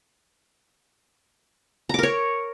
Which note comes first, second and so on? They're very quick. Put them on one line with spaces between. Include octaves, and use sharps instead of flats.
A#5 D6 A#4 C#5